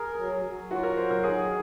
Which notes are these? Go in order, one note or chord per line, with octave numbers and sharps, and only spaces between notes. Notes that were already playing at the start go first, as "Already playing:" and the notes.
Already playing: G#4 A#4
F#3
F#3
F4 F#4
A#4
F#3 C5
A#4
D#3 G#4